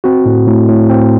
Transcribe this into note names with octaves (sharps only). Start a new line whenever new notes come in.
C4 F#4
A2
A2
A2
C4